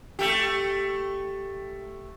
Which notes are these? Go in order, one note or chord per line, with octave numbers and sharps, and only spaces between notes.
A3 G4